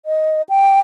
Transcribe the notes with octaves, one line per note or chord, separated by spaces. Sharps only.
D#5
G5